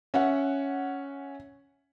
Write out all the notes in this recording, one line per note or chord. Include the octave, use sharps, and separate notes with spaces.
C#4 E5 F#5